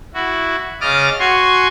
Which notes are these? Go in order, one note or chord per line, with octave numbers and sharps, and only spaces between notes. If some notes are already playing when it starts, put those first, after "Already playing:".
E4 F#4
C#3 D#5 D6 D#6 F6 A6
F#4 G#5 C6 C#6